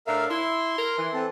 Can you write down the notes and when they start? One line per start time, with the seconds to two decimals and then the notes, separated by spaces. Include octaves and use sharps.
0.07 A2 D4 A#4 E5 F5
0.30 E4 C6
0.77 A#4
0.97 E3
1.13 C4 A4